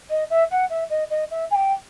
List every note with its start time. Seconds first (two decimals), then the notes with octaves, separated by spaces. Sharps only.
0.10 D#5
0.30 E5
0.51 F#5
0.70 E5
0.90 D#5
1.10 D#5
1.31 E5
1.50 G#5
1.55 G5